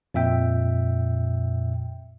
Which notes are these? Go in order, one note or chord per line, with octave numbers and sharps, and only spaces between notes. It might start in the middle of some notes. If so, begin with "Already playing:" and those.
F2 A#2 E5 G5